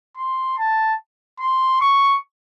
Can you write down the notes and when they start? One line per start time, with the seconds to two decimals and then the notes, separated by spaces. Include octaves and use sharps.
0.17 C6
0.58 A5
1.40 C6
1.81 C#6